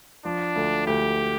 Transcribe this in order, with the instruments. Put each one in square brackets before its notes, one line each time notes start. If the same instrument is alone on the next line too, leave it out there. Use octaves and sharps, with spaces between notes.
[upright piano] F3 [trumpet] D4
[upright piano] D2
[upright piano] D2 [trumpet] G4